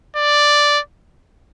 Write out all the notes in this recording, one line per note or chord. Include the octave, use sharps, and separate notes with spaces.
D5